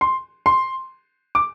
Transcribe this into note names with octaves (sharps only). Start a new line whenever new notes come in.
C6
C6
D6